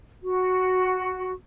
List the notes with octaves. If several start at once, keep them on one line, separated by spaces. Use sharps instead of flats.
F#4